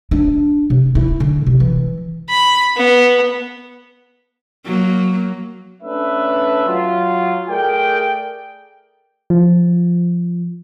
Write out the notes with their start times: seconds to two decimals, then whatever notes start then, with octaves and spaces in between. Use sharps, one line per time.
0.11 D4
0.70 C3
0.95 E4
1.20 D3
1.46 C3
1.60 E3
2.30 B5
2.77 B3
4.65 F#3 A#3
5.83 A3 C#4 D4 B4 E5
6.67 F#3 F4
7.49 A3 G#4 A#4 D5 G5
9.30 F3